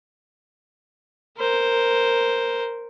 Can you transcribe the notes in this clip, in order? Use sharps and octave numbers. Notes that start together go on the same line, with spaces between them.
A#4 C5